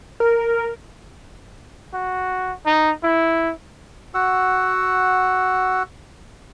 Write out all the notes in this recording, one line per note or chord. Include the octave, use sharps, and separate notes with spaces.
A#4
F#4
D#4
E4
F#4 F#5 E6